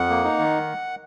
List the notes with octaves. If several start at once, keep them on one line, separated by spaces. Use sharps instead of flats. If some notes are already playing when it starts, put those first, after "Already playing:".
Already playing: F2 F#5
A#3
D#4
D#3